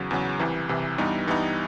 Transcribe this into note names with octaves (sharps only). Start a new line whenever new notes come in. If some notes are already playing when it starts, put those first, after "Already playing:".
Already playing: E2 C#3 F#3
E2 C#3 F#3
C2 C3 E3
C2 C3 E3
G2 E3 G3 B3 D#4
G2 E3 G3 B3 D#4